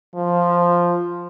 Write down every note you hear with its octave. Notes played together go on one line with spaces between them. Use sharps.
F3